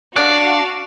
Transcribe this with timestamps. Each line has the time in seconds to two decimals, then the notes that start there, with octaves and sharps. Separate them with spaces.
0.16 D4 F#4 D5 F5 F#6